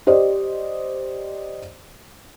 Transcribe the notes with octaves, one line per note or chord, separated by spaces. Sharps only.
G4 C5 D5 D#5